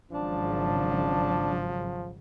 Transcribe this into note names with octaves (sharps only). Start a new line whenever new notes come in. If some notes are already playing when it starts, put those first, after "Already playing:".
G#1 C#3 F3 F#3 D4